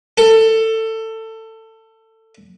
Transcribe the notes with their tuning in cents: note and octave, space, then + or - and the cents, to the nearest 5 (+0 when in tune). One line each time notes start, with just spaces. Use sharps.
A4 +20